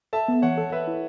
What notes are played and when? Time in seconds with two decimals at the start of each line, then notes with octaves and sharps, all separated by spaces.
0.13 A4 E5 A5
0.28 B3
0.42 E3 C#5 F#5
0.58 A4
0.72 A4 B4 E5
0.87 E4